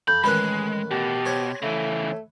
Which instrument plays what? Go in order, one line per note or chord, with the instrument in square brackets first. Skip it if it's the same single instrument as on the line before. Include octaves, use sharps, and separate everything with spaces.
[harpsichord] F2 [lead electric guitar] B5 [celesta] G6
[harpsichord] A1 D#3 B4 [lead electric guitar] G#3 [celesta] B5 F#6
[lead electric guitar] B2 [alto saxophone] G4
[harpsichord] C5 C#5
[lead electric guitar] C#3 E3 [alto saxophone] A3